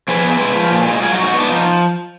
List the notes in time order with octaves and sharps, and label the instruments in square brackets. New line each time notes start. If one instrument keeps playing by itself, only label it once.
[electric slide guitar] F3 G#4 B4
B3
G#3
F3
A#2
G#3
F#3 F4 G#4
D#4 F#4
G#2
D#4 F#4
B3 D4
F3 D#4